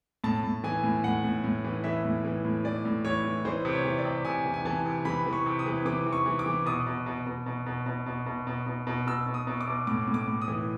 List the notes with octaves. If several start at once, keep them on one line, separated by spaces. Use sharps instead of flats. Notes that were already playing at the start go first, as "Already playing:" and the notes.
A2 A5
A2
E3 G#5
A2
A2 F#5
A2
A2
E3
E3 E5
A2
E3
A2
E3 D5
A2
E3 C#5
E3
E3 C5
C3
C#5
E3
D5
C3
C3 G#5
E3
G#5
E3 A5
C3
E3 B5
E3
C#6
C3
D#6
E3
E3 D6
E3
C#6
E3
D6
E3
B2 D#6
B2
B2
B2
B2
B2
B2
B2
B2
B2
B2
B2
B2 E6
B2
D#6
B2
D6
B2
A2 D6
A2
D6
A2
D#6
E3